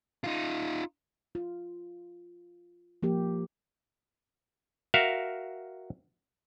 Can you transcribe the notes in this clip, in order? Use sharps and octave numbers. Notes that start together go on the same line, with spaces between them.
D#4 F4
F4
F3 A#3 G4
F#4 A#4 E5 F5